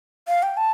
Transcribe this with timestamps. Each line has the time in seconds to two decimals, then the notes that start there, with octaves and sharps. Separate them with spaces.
0.28 F5
0.42 G5
0.57 A5